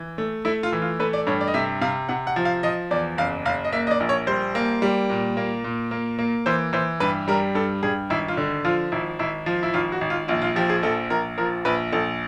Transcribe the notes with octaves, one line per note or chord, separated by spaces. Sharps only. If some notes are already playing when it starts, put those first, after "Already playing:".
Already playing: E3
A3
A3 E4
F4
E3
F4
A3 B4
D5
G2 C#5
D5
D#5
C3 E5
C3 F5
C3 F#5
F#5
F3
F5
F3 D#5
E2 D5
F#1 F5
F#1 F5
D#5
A#3 E5
D#5
D5
A#1
C#5
G3 C5
A#3
G3
A#2
A#3
A#2
A#3
A#3
E3 C5
E3 C5
G2 B4
G3 A#4
G2 A4
G2 G#4
G#1 E4
F4
D3
F3 F4
G#1 E4
G#1 E4
F3 F4
E4
G#1 F4
F#4
G#1
F4
A#1 F4
F4
F3 G4
G#4
A#1 A4
A#1 A#4
F3 A#4
A#1 B4
A#1 A4